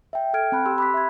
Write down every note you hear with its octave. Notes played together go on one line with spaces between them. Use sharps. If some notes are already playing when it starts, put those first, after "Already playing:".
E5 G5
A4 G5 F6 G#6 D7
C4 A5 B5 F#6
G4 C6 E6
B5 D6 F#6 B6
E5 G#6